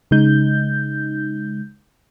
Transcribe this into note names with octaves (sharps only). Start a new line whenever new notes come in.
C#3 G#3 D#4 G6